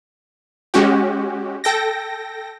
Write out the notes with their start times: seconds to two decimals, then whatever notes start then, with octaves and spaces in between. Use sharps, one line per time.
0.74 G#3 C#4 F#4 G4
1.64 A4 G5 A#6